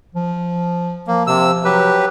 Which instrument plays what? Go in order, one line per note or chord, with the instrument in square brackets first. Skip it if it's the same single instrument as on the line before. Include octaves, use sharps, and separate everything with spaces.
[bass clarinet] F3
[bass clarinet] F3 [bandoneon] A#3
[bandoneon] C3 E6
F#3 G4 B4